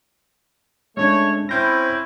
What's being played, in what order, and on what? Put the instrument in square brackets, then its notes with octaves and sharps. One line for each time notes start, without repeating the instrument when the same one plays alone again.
[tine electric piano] G#3 C#4 D4 [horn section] A3 C#5
[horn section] C4 C#4 E4 [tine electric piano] C5 G6 A#6